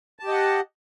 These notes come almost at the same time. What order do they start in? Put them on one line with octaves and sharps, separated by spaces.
A5 G4 D#5 F#5